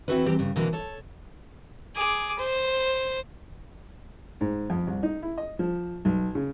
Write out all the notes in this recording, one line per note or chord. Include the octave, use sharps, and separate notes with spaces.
E2 C4 E4 F#4 A4 B4
E3 G3 C4 G4 A#5
G2 C#3
B2 D3 E3 F#3 A#3 A#4
A4 C#5
G#4 D6
C5
G#2
F2
C2
D#4
E4
D#5
F3
B1
C#3